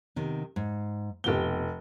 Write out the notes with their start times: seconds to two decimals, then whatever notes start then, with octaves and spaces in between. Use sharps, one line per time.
0.16 C3 D#3 B3
0.56 G#2
1.24 F1 B2 G4 G7